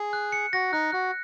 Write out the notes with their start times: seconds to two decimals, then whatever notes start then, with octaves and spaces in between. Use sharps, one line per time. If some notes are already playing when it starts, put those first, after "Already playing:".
Already playing: G#4
0.13 F#6
0.32 C#7
0.53 F#4 A#6
0.73 D#4 F#6
0.92 F#4 F#6